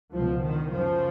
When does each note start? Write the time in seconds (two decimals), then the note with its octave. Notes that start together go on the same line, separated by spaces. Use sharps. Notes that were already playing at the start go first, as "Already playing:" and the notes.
0.12 C#2 B2 F3
0.43 D#3
0.71 F#2 C#3 F3